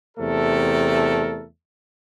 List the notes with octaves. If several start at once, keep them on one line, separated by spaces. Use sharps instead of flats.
E2 C3 A3 A4 A#4